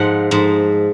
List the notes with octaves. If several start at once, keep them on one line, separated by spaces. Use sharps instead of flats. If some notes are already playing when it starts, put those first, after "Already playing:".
Already playing: G#2 F3 F#5
G#2 F3